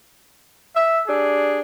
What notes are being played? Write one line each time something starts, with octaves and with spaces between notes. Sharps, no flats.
E5
D4 G4 G#4